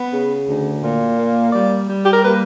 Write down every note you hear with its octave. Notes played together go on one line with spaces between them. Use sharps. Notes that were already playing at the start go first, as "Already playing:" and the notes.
Already playing: B3
C#3
D2
A#2
A#3
G3 D5
G3
G4
A#4
A#3 B4